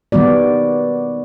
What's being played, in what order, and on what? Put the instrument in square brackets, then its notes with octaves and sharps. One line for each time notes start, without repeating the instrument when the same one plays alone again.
[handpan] D#3 G3 B3 F#4 D5